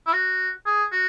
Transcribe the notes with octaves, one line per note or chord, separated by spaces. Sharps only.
E4
F#4
G#4
F#4